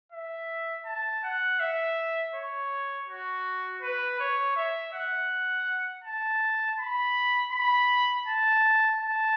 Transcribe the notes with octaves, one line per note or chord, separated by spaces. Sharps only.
E5
A5
F#5
E5
C#5
F#4
B4
C#5
E5
F#5
A5
B5
B5
A5
A5